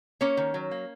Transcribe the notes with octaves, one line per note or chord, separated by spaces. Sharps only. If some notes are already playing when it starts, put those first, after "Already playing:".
A#3 C#4 C#5
D#3
F#3
A#3